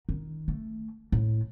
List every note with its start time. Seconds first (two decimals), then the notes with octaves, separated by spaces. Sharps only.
0.09 D#3
0.48 A3
1.12 A2